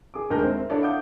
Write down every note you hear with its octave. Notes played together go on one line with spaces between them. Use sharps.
G#4 D6
D#2 G#3 A3 D4 A#4 G6
C4 C5 E5
D4 E4 A4 C#5 D5
F5 F#5 D6 D#6 G6